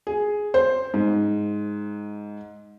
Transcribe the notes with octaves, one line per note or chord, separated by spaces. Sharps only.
G#4
C5
G#2